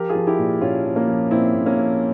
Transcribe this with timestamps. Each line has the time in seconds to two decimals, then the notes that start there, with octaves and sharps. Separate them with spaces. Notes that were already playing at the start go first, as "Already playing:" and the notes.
Already playing: F3 G4 A#4
0.09 F4 G#4
0.15 F3
0.27 E4 G4
0.38 A#2
0.61 A#2 C#4 F4
0.84 F3
0.96 A#3 C#4
1.08 F3
1.30 A#2 C4 E4
1.54 A#2
1.66 A#3 C#4
1.77 F3